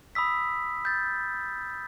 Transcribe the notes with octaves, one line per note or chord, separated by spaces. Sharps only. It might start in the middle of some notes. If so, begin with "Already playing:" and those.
B5 D#6 E6 B6
G6 A6